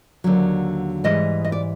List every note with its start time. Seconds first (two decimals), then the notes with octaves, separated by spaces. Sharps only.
0.24 D#2 D3 F#3
1.04 G#2 E3 G3 D#5
1.44 D#5
1.52 D5